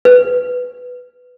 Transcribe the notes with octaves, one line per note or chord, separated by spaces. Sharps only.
B4